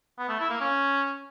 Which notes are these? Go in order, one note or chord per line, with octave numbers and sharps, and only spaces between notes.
B3
A3
E4
A#3
C#4